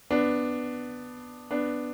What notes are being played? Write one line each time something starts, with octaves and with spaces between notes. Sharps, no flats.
B3 D4
B3 D4